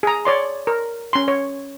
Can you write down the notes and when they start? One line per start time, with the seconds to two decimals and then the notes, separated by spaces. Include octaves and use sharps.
0.03 G#4 A#5
0.25 C#5 D5 C6
0.67 A#4
1.13 C#4 C6
1.28 C#5